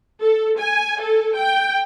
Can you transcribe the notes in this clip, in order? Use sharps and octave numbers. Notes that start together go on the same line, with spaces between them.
A4
G#5
A4
G5